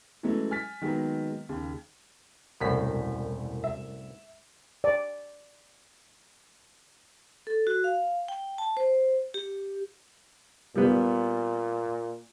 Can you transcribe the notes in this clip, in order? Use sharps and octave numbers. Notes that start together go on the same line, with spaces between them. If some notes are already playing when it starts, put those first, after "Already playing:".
E3 F#3 G#3 A3 C#4
G#5 F6 A6 B6
D#3 F#3 G#3 A#3 B3
D#2 C#3
E1 C2 F#2 A2 B6
E5
D5
A4
F#4
F5
G5
A5
C5
G4
A#2 G3 B3